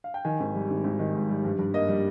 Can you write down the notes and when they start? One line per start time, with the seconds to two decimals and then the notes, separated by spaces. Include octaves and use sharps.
0.04 F5
0.14 G5
0.25 D#3 G#5
0.40 G#1
0.55 G3
0.70 G#1
0.84 G#1
0.99 D#3
1.14 G#2
1.29 G3
1.45 G2
1.59 G2
1.74 A#3 D#5
1.89 G3